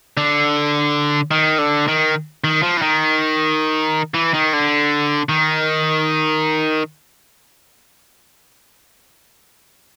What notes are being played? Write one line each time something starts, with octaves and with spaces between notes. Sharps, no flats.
D3
D#3
D3
D#3
D#3
F3
E3
D#3
E3
D#3
D3
D#3